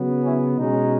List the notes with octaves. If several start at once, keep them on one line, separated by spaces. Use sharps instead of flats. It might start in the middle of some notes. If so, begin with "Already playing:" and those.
Already playing: C#3 F#3 B3
C#4 E4
B2 G#3 C#4 D#4